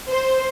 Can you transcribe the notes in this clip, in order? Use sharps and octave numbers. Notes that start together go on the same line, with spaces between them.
C5